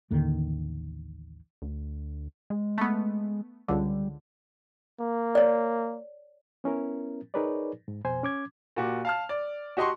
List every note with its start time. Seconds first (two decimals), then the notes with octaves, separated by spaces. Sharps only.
0.10 A1 D#2 D3 D#3
1.62 D2
2.50 G#3
2.78 A3 B3
3.68 C#2 D3 G3
5.00 A#3
5.35 C#5 D5
6.64 B3 C#4 E4 A#4
7.34 D#4 G#4 A#4 B4 C#5 D5
7.88 G#2
8.04 F2 B2 C5 G#5
8.23 C#4 D6 G#6
8.76 A#2 F#4 G4
9.05 F5 A5 F6
9.29 D5
9.77 F#4 G4 D#5 A5 C6 C#6